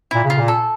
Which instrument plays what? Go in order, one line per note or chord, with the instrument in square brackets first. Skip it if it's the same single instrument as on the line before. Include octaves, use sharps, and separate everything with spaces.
[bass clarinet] A#2 [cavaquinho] E4
[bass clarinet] C#3
[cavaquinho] F4
[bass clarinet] A#2
[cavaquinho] A4